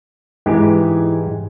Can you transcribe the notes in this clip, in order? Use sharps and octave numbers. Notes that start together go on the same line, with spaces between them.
G#2 E3 G#3 G4